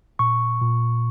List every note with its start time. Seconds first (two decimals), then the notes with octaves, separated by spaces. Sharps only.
0.19 A#2 C#6
0.62 A#2